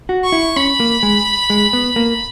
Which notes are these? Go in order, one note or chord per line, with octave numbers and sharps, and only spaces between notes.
F#4
C#6
E4
C#4 B5
A#3
G#3
G#3
B3
A#3